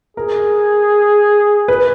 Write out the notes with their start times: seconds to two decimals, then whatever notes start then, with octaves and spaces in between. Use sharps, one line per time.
0.17 G#4 A#4
1.68 B4